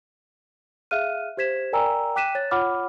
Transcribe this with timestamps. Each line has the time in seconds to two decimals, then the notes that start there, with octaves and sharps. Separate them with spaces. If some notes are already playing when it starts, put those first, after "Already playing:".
0.91 G#4 E5 F5 F6 F#6 D#7
1.37 G4 C5 G#6 B6 E7
1.73 A#4 D5 G5 G#5 A#5 E6
2.16 G5 D6 F#6 B6 D#7 E7
2.35 C#5 F#6 A6
2.51 F4 C#5 F#5 B5 D6 F6